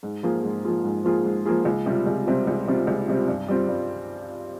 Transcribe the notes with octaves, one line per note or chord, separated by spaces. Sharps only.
G#2
F3 A#3 F4 G#4
G#2
F3 A#3 F4 G#4
G#2
F3 A#3 F4 G#4
G#2
F3 A#3 F4 G#4
C#2
C3 G3 C4 F4
C#2
C3 G3 C4 F4
C#2
C3 G3 C4 F4
C#2
C3 G3 C4 F4
G2
G3 C4 F4
G2